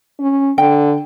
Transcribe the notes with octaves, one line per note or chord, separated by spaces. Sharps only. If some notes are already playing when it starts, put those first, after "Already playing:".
C#4
D3 G5